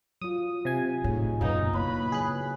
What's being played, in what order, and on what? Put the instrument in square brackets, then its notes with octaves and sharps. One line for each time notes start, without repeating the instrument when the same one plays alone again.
[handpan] F#3 F4 [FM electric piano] D#6
[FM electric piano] C3 G#5
[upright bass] A2 [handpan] D#4 G#4 C#5
[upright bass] F#2 A#2 [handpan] C#3 F#4 F5 [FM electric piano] F#3 B3 [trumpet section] D#4
[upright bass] A#3 [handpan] E4 C#5 F5 [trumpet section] B4 B5
[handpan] C#3 F#3 C#5 [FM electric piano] G#4 F#6